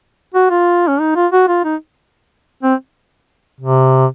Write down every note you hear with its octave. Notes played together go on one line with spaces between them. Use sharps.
F#4
F4
C#4
D#4
F4
F#4
F4
D#4
C4
C3